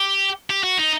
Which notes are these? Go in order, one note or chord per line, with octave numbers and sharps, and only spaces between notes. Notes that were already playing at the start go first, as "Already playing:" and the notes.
Already playing: G4
G4
F#4
D#4